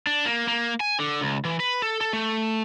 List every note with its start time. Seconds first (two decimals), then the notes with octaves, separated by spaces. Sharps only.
0.07 D4
0.25 A#3
0.48 A#3
0.80 G#5
1.00 D3
1.21 C#2
1.45 E3
1.60 B4
1.82 A4
2.01 A4
2.13 A3